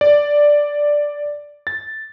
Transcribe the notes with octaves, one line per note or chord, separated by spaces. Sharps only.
D5
A6